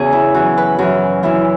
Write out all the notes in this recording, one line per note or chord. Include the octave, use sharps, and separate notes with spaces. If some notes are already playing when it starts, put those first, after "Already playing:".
Already playing: E2 C#3 F#4 G#4
E4
F#2 E3 F#4
B4
F#2 E3 F#4
F#2 E3 E4